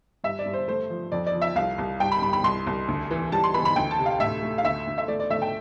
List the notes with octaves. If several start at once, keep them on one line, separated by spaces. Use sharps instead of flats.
G2 E5
D5
G2
C5
A3 C5
F3
F2 D5
D5
F3
E5
C2 F5
C2
G2 G5
B5
G2 B5
B5
C2 C6
C2
D2
E3
G3 A5
C6
E3 B5
B5
D2 G5
A5
C3
F5
A2 E5
A3
F5
D2 E5
D2
E5
A3 D5
D5
A3 E5
G5